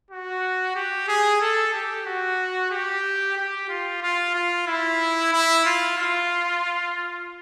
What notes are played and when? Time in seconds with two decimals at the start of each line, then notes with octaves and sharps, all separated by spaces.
0.11 F#4
0.75 G4
1.08 G#4
1.41 A4
1.73 G4
2.06 F#4
2.71 G4
3.37 G4
3.69 F4
4.02 F4
4.35 F4
4.67 E4
5.33 E4
5.65 F4
5.97 F4